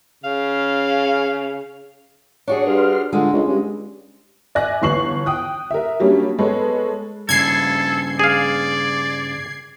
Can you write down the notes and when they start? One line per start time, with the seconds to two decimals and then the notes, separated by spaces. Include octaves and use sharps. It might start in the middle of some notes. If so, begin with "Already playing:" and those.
0.24 C#3 F5
2.48 D4 F#4 G#4 C#5 C#6
2.67 G2 B4 C6 F6
3.13 D3 G#3 F4
3.33 C#2 D4
3.48 G2 C#4
4.55 D5 E5 G#5 F#6 A#6
4.82 G1 E3 C#6 C7 F#7
5.26 G5 D#6 F#6
5.71 A#4 E5
6.00 F#3 G3 A#3 C#4 D4
6.39 G#3 B3 A4 B4 C#5
7.29 G2 C#3 A4 G#6 C7
8.19 G#4 D5 F5